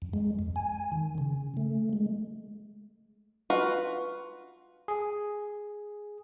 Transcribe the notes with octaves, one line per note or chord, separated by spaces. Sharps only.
F2
G#3
F2
G#5
D#3
C#3
A3
G#3
F4 F#4 B4
G#4